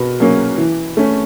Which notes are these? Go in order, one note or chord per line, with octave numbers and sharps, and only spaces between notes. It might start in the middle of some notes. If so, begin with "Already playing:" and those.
Already playing: B2 A#4 B4
F#3 A#3 C#4
E3
A3 C#4